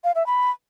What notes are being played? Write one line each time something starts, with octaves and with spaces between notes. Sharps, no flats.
F5
E5
B5